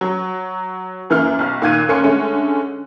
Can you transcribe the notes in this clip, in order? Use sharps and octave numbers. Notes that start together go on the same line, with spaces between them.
F#3
F#2 E3 A#3 F6
B1 F6
A#2 D#3 F5 F#6 G#6 D#7
D#2 A#3 C#4 C6 C#7
D3 G#3 A3 C#4